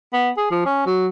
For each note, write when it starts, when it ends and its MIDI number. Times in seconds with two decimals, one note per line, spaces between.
0.13 0.30 59
0.37 0.46 68
0.51 0.62 53
0.65 0.86 61
0.86 1.07 54